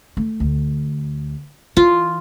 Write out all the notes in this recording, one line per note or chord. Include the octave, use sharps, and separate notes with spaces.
A3
D2
E3 F4